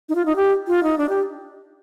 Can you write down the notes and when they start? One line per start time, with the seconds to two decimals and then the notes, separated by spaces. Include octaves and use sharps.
0.09 D#4
0.15 F4
0.26 D#4
0.36 G4
0.68 F4
0.83 D#4
0.98 D4
1.09 G4